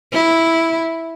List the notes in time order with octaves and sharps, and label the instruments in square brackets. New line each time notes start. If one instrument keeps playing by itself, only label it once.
[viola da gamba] E4